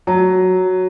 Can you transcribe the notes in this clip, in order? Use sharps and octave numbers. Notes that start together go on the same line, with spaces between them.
F#3